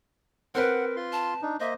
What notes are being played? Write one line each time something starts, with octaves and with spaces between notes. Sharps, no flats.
C4 A#4 B4 F#5
F4 C6
A5
D4 D#4
A#3 C5 D#5 E5